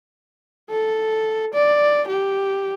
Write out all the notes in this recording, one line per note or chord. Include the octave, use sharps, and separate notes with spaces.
A4
D5
G4